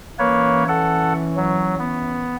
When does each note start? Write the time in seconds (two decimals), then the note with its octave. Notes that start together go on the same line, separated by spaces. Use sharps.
0.19 E3 A#3 C#4 B4 C#5
0.68 A4 F#5
1.37 F#3
1.79 B3